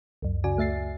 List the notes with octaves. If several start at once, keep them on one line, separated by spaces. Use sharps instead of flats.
C#2 F#2
C#3 F#4 D5 G#5
C#2 A3 E5 A6 C7